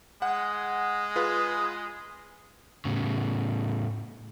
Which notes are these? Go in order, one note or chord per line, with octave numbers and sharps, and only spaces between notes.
G#3 F#5
F4 G#4 B4
A2 C#3